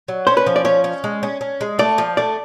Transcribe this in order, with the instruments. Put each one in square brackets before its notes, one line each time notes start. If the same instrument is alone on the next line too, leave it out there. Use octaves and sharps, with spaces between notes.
[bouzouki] F#3
[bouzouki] C#4 [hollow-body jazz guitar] C5
[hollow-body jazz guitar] B4
[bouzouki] F3
[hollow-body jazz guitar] D5
[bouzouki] C#4 [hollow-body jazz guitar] C#5
[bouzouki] C#4
G#3
C#4
C#4
G#3
[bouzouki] A3 [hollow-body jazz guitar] D5
[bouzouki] F3
[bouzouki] A3 [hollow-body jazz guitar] D5